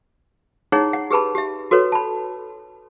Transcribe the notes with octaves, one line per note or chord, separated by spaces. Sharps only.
D#4 E4 G#4 C#5 F#5 A#5
F#5
G4 G#4 B4 A5 B5
G4 E5
F#4 A4 B4 C#5
A5 B5